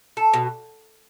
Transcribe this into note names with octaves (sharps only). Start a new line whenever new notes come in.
A4
B2